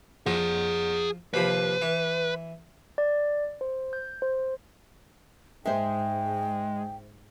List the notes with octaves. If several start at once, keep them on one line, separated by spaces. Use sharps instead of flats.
F3 G#4 F#5
D#2 C3 F3 B4
E3
D5
C5
G6
C5
G#2 G#3 C5 E5 G5